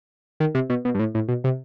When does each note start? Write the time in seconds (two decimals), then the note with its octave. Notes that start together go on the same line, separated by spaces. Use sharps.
0.40 D#3
0.55 C3
0.70 B2
0.85 B2
0.95 G2
0.99 A2
1.15 A2
1.28 B2
1.44 C3